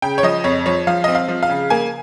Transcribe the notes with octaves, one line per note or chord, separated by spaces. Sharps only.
C#3 G5
C#5
F3 D#5
F2 C#5
F3 C#5
F3 F5
C4 D#5
F5
F3
F5
C#3
A#3 G#5